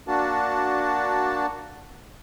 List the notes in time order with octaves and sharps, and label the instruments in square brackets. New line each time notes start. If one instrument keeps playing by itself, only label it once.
[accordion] A#3 D4 F#4 A5